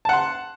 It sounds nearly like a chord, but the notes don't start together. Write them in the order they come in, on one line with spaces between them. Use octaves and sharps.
A5 F#5 C6